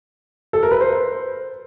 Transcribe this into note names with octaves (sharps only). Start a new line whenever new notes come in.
A4
A#4
B4
C5